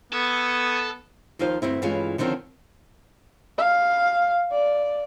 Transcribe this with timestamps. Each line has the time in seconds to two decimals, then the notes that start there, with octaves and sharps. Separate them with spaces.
0.12 B3 A4 C#6 D#6 G#6
1.39 D#2 F3 D#4 F4 C5
1.62 D2 G2 C4 E4
1.82 G2 E3 G#3 C#4 F4
2.18 D3 D#3 F3 C4 C#4
3.58 F5
4.52 D5